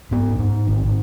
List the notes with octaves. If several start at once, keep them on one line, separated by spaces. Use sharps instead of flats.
G#2 B3
G#2
A1